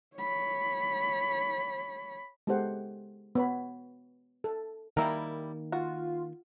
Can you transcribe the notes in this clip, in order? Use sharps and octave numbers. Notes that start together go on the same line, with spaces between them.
C#5 B5
G#3 B3 G4 A4 C5 F#5
B3 C#5 B5
A4
D#3 G3 A#3 E4 A#4
F4 F#4